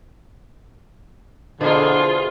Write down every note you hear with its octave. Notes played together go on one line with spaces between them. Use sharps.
B2 D3 E3 F3 A#3 F4 G#4